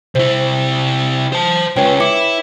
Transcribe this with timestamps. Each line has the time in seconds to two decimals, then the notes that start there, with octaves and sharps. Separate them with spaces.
0.15 C3 E4 C5
1.33 C5 A5
1.76 C#2 C#3 B4 C#5 G5
2.00 E4 D6 C#7